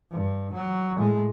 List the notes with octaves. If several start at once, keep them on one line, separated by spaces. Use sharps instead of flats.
G2
F#3
A2 G#3